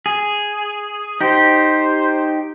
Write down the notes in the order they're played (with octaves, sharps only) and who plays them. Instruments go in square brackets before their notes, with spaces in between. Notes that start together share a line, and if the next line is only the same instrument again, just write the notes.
[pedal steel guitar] G#4
[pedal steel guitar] D#4 G4 [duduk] C5